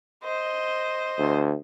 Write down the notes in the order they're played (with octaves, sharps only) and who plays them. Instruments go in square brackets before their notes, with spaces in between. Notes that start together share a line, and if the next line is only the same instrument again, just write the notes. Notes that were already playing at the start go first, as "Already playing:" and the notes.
[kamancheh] C5 D#5
[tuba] D2